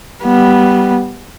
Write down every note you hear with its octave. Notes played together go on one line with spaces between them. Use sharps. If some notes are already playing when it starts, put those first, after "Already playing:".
G3 B3